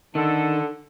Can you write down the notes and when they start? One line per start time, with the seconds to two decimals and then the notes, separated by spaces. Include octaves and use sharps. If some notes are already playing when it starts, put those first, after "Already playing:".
0.15 D3 D#3 A4